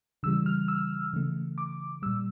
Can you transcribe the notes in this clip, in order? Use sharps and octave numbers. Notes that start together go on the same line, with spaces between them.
C#3 E3 G3 E6
F6
E6
C#3 E3 A3
D6
A#2 G3 E6